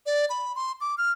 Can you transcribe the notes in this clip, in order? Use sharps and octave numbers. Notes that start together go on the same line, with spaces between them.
D5
B5
C6
D6
F6